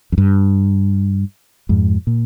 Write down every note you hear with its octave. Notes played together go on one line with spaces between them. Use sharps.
F2
G2
F2 G#2
A#2